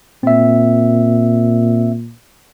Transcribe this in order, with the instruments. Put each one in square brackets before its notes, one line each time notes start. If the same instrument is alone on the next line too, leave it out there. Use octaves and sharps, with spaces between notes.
[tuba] A#2 [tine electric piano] C4 E5